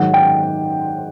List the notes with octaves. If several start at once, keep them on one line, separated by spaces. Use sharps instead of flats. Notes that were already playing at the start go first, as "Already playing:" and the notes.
Already playing: G#2 D#3 F#3 F#5
G5